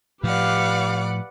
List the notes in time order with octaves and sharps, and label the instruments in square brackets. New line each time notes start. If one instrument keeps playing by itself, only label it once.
[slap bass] A2 F3 [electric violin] G4 F5 [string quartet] B4 D5 F#5